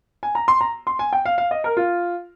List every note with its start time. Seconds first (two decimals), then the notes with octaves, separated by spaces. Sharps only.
0.23 G#5
0.35 A#5
0.48 C6
0.61 A#5
0.87 C6
0.99 G#5
1.13 G5
1.26 F5
1.38 F5
1.51 D#5
1.64 A#4
1.77 F4